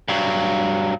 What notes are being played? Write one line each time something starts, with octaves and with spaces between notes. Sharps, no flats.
G2 F#3